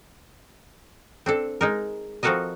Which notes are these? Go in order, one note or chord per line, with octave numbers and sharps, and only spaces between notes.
C4 D4 A4
G#3 D#4 A#4
F3 C4 F#4 A4 A#4 D#5